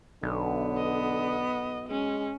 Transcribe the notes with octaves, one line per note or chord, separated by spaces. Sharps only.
B1 D3 B3
D#5
G#3 C#4